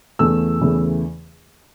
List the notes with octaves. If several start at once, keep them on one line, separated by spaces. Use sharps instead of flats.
E2 C#3 E3 A3 E6
E2 C#3 E3 A3